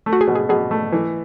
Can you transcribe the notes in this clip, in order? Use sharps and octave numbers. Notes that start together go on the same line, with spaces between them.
A3
F#4
G#4
B2
G#4
B2 G#4
A3
E3